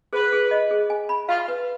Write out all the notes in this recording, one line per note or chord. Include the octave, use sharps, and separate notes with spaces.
G#4 B4
G#4
D#5
G#4
G#5
B5
F4 F5
B4